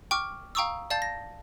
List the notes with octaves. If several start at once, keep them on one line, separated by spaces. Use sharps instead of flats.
G5 C#6 D6 F6
F5 G5 A#5 C#6 D#6 E6
D5 F5 A5 G6 A6
A#6